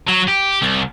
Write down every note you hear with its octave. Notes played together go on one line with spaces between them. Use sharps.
F#3
G4
C2